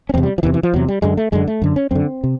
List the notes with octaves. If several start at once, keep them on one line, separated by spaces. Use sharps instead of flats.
C#4
E2 C3 C4
G3
F3
E2 C3 E3
E3
F3
E2 C3 F#3
G3
F#2 D3 G#3
A3
F#2 D3 G#3
A3
F#2 D3
C#4
F#2 D3 C4
C3